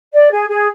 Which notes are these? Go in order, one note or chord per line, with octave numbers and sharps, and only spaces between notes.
D5
G#4
G#4